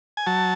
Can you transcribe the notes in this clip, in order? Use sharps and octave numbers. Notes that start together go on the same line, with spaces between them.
G#5
F#3 A5